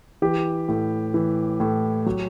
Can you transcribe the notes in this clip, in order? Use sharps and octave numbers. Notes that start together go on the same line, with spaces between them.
E3 G4
A2
E3
A2
F#3